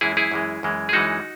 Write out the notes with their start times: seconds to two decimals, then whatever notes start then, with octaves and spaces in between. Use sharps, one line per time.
0.01 F#2 E3 G#3 E4 G#4
0.17 E4 G#4
0.32 F#2 E3 G#3
0.63 F#2 E3 G#3
0.89 G#4
0.93 F#2 E3 G#3 D#4 F#4